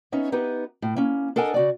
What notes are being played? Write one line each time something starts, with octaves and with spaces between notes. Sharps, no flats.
B3 C#4 D#4 C#5 E5
B3 D#4 G4 B4
A2
A#3 C#4
D4 A4 A#4 D#5 F#5 G#5
C#3 F#4 D5